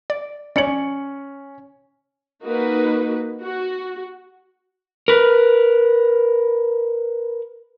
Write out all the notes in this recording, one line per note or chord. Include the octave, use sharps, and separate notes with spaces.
D5
C#4 C#5 D5 C#7 F#7
A#3 D#4 F#4 B4
F#4
A#4 B4